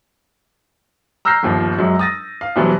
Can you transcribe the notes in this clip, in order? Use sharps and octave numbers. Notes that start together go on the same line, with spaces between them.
A#5 E6 F6 G6 A#6 C7
G1 D#2 F3
F#2 F#3 G#3
D#6 A6 A#6
F5
D2 B2 E3 F#3 G3